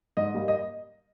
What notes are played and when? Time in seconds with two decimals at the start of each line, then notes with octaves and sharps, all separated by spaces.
0.17 G#2 D#5
0.34 G3 A#3
0.48 D#5